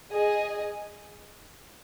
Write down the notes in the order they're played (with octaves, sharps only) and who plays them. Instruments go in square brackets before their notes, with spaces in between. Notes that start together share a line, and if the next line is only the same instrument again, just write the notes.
[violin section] G#4 D#5 G#5